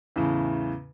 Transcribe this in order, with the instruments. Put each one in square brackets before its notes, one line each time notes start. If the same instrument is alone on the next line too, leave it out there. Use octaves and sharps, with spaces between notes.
[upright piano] E2 A2 C#3